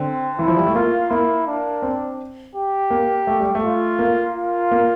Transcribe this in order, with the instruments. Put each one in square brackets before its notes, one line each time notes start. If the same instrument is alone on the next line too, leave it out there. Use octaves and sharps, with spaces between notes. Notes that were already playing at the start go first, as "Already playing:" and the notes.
Already playing: [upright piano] D3 [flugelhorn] C4
[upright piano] E3 [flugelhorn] E4
[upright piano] F3
G3
A3
[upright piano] A#3 [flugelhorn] F4
[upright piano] A#3 [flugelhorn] E4
[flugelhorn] D4
[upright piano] C4
[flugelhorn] G4
[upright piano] A#3
A3
G3
A3
[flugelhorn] F4
[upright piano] A#3
[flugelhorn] F4
[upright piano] A#3